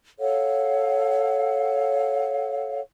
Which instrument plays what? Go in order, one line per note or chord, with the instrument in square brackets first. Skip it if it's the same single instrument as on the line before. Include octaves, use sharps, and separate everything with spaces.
[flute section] A4 C#5 F5 F#5